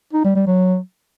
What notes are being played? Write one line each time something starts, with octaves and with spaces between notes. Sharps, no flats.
D#4
G3
G3
F#3